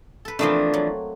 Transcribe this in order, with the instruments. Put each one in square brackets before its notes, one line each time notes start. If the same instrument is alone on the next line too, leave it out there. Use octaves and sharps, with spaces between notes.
[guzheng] A4 B4
[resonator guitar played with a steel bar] E3 F3 D4 [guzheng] A3 A#3 C4
[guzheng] F#3